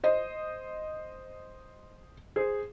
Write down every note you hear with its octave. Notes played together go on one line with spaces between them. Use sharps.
C5 D#5
G#4 C5